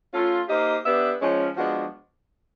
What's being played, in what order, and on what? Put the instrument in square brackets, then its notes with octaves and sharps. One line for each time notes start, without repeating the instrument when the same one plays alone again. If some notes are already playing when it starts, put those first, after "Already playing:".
[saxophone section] A3 C#4 F4
A#3 D#4 G4 C5 D#5
B3 D4 G4 B4 E5
F3 G#3 C#4
F3 G#3 B3 D4 F#4